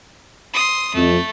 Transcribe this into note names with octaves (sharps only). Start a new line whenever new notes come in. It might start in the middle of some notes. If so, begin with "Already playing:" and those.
C6 D#6
F2 A3